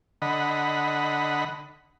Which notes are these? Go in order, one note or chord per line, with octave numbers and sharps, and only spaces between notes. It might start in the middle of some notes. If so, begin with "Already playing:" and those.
D3 D#5 F#5 B5